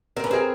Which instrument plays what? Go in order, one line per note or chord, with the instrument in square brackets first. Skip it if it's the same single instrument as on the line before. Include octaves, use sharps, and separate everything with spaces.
[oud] C4 [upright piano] A#4
[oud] C#4 [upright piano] B4
[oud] C4 [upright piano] G#4 A#4